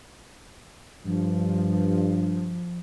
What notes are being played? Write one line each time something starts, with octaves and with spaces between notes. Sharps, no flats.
G2 F3